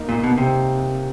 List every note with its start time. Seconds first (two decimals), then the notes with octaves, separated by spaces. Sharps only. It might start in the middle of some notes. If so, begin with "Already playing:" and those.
Already playing: A#3 D#4
0.09 A#2
0.24 B2
0.38 C3